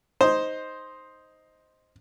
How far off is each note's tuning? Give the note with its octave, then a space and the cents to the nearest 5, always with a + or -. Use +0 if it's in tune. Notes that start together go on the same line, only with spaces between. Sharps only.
D#4 +5 C5 +0